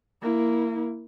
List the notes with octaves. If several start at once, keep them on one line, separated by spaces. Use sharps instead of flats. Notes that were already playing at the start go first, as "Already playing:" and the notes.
A#3 E4